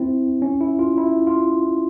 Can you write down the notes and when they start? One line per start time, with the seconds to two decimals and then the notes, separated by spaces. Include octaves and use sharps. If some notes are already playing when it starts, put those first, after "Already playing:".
Already playing: C4 E4
0.42 C#4
0.61 E4
0.79 F4
0.98 E4
1.27 F4